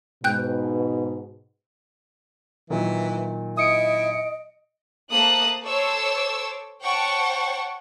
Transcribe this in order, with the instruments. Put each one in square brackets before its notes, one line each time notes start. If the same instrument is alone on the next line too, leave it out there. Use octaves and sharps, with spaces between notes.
[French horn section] G#2 B2 [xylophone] G5 F#6 G6
[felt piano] A#2 D#3 F#3 [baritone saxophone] E3
[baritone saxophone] E4 [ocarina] D#5 [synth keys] D#6 C#7 D7
[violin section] A3 A#3 C5 A5 D#6 F#6
A4 C5 C#5 C#6 D6 E6
C5 C#5 F#5 G5 A5 C#6